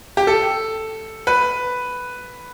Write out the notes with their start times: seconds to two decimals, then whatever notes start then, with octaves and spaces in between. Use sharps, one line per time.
0.17 G4
0.27 A4
1.27 B4